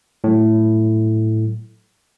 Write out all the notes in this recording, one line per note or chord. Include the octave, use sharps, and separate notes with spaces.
A2 F#3